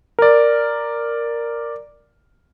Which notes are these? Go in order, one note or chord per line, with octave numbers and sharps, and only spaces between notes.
A#4 D5